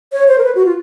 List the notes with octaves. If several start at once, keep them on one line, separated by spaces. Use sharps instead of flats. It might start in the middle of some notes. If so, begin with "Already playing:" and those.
C#5
C5
A#4
B4
F#4
F4